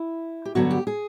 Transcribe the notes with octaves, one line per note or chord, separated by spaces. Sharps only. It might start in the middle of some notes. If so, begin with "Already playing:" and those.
Already playing: E4
G4
G2 D3 F#3 B3 F#4
G4
G#4